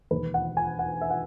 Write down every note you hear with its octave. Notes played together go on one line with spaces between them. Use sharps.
E1 D#2 D#3 B4
F#5
G#5
F#5
E5
F#5